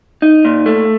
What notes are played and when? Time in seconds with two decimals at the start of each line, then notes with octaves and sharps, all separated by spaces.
0.22 D#4
0.45 A#2
0.66 A3